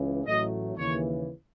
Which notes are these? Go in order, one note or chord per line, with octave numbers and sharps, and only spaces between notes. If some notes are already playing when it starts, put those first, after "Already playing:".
Already playing: C#2 C#3 E3
A1 A2 F#3 A3 D#5
D#2 C#3 E3 C#5